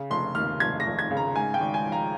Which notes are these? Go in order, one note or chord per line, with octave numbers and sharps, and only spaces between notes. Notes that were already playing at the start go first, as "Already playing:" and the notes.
Already playing: C#3
F1 C6
D#2 F6
F1 G#6
A#6
F1
G#6
C#3
A#5
G#2 G#5
G5
G#1
G#5
F3
A#5